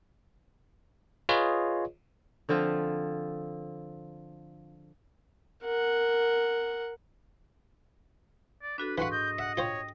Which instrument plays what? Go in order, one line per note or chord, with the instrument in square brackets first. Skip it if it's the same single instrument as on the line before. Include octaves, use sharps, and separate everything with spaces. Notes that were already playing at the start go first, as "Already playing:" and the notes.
[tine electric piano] F4 G#4 B4 C#5 D#5
[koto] D3 F3 C4 F4
[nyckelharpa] A#4 F#5
[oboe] D5
[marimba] D4 F#4 A4 [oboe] B4
[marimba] G#2 C6 C#6 [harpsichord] E3 F5 [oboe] B4 [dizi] F#5
[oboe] D#5 [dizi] G6
[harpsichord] E5 [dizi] F#5
[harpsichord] F4 C5 [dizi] C#5 [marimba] G5